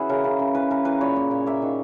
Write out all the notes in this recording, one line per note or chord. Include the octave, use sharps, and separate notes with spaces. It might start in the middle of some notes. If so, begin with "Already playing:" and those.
Already playing: E3 C#4 E4 F#4 G#4
C#3 A#4
C#3
C#3
E3 B4
E3 A#4
E3 B4
A#2 C#5
A#3
A#2
A#3 E5
D#3